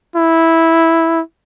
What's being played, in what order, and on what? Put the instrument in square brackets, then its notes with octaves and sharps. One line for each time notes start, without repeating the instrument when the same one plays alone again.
[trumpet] E4